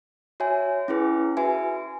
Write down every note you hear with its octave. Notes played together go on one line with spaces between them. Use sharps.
F#4 C#5 E5 G#5
C#4 E4 G#4 B4
F#4 B4 E5 G#5